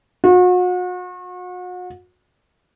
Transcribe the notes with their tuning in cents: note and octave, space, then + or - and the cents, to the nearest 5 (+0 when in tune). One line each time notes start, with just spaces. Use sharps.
F#4 -40